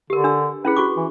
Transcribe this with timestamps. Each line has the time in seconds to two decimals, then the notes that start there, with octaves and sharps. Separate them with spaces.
0.10 D3 G4 A#4
0.24 D4 E6
0.65 C#4 E4 G#4 B4
0.76 F#4 C#6 D6
0.97 E3